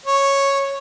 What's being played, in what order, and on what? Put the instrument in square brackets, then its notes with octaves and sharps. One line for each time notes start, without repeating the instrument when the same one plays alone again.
[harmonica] C#5